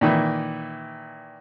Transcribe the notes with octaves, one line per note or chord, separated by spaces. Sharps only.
A#2 D#3 E3